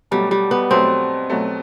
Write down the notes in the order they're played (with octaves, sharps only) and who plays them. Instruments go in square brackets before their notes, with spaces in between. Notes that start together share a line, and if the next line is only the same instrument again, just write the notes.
[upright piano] B2 F#3 A3 [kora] G3
[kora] G3
B3
[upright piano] B2 F#3 A3 [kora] C4
[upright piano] B2 F#3 A3